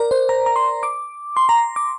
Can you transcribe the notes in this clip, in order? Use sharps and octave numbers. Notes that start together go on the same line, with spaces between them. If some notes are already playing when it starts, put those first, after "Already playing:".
Already playing: A#4 D5
C5
A#5
A#5
C6
D6
C6
A#5
D6